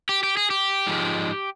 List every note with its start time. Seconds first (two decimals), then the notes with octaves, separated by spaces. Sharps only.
0.09 G4
0.23 G4
0.37 G#4
0.51 G4
0.87 G#2 F3 G#3